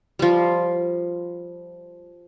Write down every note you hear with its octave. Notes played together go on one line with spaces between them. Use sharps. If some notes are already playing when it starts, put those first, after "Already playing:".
F3 G3